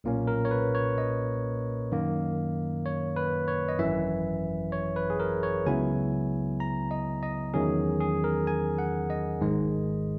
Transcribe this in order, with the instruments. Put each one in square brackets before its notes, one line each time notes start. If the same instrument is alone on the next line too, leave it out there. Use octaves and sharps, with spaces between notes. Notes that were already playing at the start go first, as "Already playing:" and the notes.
[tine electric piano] B1 A#2 A#3 C#4
A#4
C#5
B4
C#5
D#5
F#2 D#3 A#3
C#5
B4
C#5
D#5
G#1 F#2 E3 E5
C#5
B4
G#4
A#4
C#5
C#2 C#3 F#3 B3 E4 G#5
A#5
D#5
D#5
E2 D#3 F#3 C#4 G#4
G#4
A#4
G#5
F#5
D#5
G#1 G#2 D#3 G#3